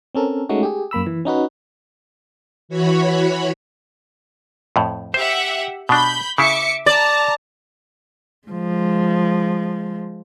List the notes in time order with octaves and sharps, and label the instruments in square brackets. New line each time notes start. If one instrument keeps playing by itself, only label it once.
[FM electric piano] C4 C#4 A4 A#4
G#3 A3 C#4 D#4 F#4
G4 G#4
F#2 A#3 B5 E6
E3
C#4 D#4 F#4 B4
[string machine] E3 F#4 C#5 B5
[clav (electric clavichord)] F2 A2
[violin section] G4 E5 F#5 [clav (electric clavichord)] C5
[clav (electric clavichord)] B2 D4 [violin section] B5 G6
[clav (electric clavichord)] C#3 E4 [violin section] E5 D6 C#7
[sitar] D5 [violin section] A5 A#5
[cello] F3 G#3